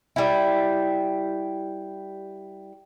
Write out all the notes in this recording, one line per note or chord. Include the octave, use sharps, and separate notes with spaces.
G3 E4